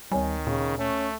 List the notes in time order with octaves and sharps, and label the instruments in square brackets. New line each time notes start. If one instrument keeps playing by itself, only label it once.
[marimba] D2 C#5 G#5 [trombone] D#3 [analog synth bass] G3
[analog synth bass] A#2 [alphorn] C#3
[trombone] A3 [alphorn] C#4